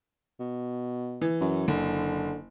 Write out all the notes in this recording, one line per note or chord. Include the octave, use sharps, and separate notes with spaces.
B2
E3
F#2
F#1 D3